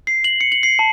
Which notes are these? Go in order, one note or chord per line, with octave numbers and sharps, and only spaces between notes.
C7
F#7
C#7
F#7
C7
A5